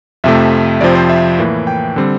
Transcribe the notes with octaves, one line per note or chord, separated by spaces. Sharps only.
F2 C3 F3 A3 E5
F2 C3 F3 C4 D5
C5
E5
A2 E3 A#3
G5
D3 G3 C4